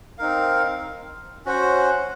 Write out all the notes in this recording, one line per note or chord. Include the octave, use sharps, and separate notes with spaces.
C4 D#4 A#4 F5
C#4 F#4 C5 F#5